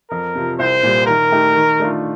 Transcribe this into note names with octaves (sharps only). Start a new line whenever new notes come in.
F2 A#4
C3 F3
C2 C5
A#2 G3
D#3 A#4
A3 D#4 G4
D#3
A3 D4 F4